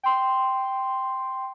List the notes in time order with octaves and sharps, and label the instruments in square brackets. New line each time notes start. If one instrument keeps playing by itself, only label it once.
[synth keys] G5 C6